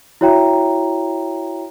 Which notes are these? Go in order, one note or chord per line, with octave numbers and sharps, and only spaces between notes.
E4 F#4 C#5 E5 G5 A#5